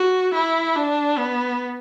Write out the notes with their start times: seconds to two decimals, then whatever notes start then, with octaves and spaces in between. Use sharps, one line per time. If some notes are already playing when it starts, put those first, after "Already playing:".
Already playing: F#4
0.34 E4
0.76 D4
1.18 B3